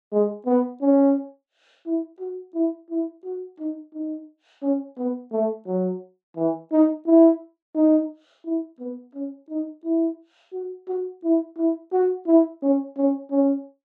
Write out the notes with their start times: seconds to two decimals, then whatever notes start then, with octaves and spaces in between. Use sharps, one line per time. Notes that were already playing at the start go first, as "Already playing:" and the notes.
0.12 G#3
0.46 B3
0.82 C#4
1.86 E4
2.20 F#4
2.54 E4
2.90 E4
3.24 F#4
3.60 D#4
3.94 D#4
4.63 C#4
4.98 B3
5.32 A3
5.67 F#3
6.37 E3
6.72 D#4
7.06 E4
7.75 D#4
8.45 E4
8.79 B3
9.15 C#4
9.49 D#4
9.84 E4
10.53 F#4
10.88 F#4
11.24 E4
11.57 E4
11.92 F#4
12.27 E4
12.63 C#4
12.97 C#4
13.31 C#4